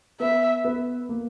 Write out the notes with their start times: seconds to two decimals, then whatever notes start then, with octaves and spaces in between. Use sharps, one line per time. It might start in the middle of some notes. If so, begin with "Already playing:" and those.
0.20 B3 E5
0.64 B3
1.09 A#3